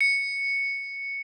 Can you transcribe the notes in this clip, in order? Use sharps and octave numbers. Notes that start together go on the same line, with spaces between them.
C#7